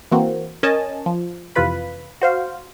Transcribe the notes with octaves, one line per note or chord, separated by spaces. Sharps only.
E3 A#3 C4 F#4
C#4 A#4 C#5 D#5 G#5 A5
F3
F2 C3 E3 F4 B4 B5
F#4 C5 F5